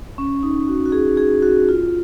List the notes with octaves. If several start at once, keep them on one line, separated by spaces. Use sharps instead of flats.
C#4
D#4
F#4
F#4
G#4
G#4
F#4
F4